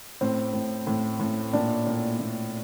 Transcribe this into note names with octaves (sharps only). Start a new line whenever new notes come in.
A2 C4
A2
A2
A2
A#2 D4
A#2
A#2